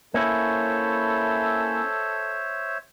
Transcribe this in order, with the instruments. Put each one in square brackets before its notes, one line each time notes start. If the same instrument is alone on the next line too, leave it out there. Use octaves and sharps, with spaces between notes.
[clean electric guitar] A#3 C#4 E4 [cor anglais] A4 [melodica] C5 C#5 E5